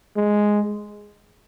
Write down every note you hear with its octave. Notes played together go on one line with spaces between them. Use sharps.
G#3